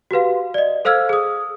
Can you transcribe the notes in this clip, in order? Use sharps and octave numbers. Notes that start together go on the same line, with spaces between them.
F#4 G4 B4 F5
D5 D#5
A4 C5 F5 E6 F6 G#6
G#4 D#6